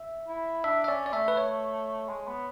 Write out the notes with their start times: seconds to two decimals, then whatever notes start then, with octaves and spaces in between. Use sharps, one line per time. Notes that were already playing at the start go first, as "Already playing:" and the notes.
Already playing: E5
0.28 E4
0.64 D4 E5
0.84 E5
0.88 C#4 D5
1.06 D5
1.13 A3 E5
1.28 B4
1.37 C#5
2.09 G#3
2.27 B3